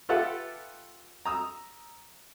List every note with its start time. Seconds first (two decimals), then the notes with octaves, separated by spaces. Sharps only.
0.09 F4 G4 A4 B4 E5 F#5
1.25 A#5 D#6 E6